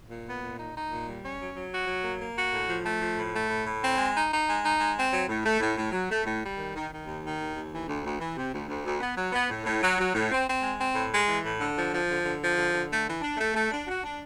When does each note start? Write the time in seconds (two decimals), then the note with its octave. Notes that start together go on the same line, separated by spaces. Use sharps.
0.08 A#2
0.25 B3
0.41 A#2
0.57 D#4
0.74 D#4
0.90 A#2
1.07 G3
1.22 C#4
1.39 F#3
1.54 F#3
1.71 F#4
1.87 F#3
2.03 A#3
2.19 A#3
2.35 F#4
2.52 A2
2.69 F3
2.84 A3
3.01 F3
3.17 A2
3.32 A3
3.49 A2
3.66 A2
3.81 C4
3.98 G#3
4.14 D#4
4.30 D#4
4.47 G#3
4.63 D#4
4.79 G#3
4.96 C4
5.11 F#3
5.27 A2
5.44 A3
5.59 A2
5.77 A2
5.92 F#3
6.09 A3
6.24 A2
6.41 G3
6.57 D#3
6.74 D#3
6.90 D#3
7.05 D#2
7.22 D#3
7.39 D#2
7.54 D#2
7.71 E3
7.87 D2
8.03 D2
8.19 E3
8.35 C3
8.52 D2
8.67 D2
8.84 D2
9.00 B3
9.16 F#3
9.32 B3
9.49 A2
9.64 A2
9.81 F#3
9.98 F#3
10.14 A2
10.30 C4
10.46 C4
10.62 G#3
10.78 C4
10.94 A2
11.11 G#3
11.27 E3
11.44 A2
11.59 D3
11.75 F3
11.91 F3
12.08 D3
12.24 D3
12.40 F3
12.57 D3
12.72 D3
12.89 A3
13.06 E3
13.21 D4
13.37 A3
13.54 A3
13.70 D4
13.87 F#4
14.03 D4